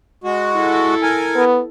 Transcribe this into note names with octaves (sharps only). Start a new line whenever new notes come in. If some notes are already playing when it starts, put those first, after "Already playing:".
G#3 F#4
E4 A4
A#4 G#5
B3